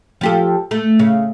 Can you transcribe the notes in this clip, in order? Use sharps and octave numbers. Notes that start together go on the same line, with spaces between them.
F3 G4 A4
A3
C#3